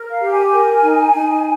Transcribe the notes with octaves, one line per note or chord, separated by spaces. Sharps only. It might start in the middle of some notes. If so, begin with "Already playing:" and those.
Already playing: A#4
F5
G4
G#5
A#4
D#4
D#4